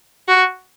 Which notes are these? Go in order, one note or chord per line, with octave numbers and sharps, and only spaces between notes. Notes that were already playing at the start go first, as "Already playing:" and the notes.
F#4